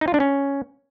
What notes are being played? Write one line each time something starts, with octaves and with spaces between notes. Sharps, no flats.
D#4
F4
D4
C#4